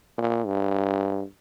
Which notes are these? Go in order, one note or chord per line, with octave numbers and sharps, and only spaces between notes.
A#2
G2